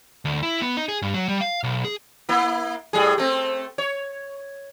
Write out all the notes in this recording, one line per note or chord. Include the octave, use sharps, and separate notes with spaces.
D2
E4
B3
D#4
G#4
G2
F#3
G3
F5
B1
G#4
A#3 E4
A2 G3 G#4
A3 C4
C#5